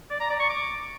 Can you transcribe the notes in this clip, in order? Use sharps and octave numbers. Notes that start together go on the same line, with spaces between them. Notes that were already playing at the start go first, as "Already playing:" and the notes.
D5
A#5
D5
C#6
D6